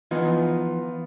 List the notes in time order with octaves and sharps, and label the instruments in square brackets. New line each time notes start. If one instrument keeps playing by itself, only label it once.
[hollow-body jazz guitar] E3 F3 D#4 [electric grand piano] B3 F4